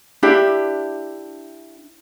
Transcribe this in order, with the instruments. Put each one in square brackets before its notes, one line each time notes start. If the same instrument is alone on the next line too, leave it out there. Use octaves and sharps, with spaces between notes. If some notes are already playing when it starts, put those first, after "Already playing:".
[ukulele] D4 E4 G4 E5